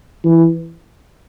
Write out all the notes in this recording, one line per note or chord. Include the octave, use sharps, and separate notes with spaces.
E3